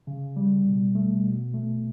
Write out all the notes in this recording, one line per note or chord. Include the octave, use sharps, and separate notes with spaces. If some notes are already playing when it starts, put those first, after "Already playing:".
C#3
G3
B2
A3
B2
A3